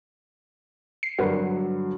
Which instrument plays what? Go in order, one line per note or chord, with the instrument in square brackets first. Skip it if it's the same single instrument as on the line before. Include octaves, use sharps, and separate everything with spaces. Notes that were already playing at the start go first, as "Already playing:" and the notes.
[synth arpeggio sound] C7
[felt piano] G2 D3 F#3 [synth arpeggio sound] F#4 A#4 B4